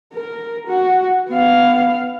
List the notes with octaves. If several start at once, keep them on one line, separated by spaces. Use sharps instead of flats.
A#4
F#4
B3 F5